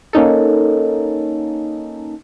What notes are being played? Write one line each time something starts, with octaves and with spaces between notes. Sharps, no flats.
A#3 C#4 D#4 A4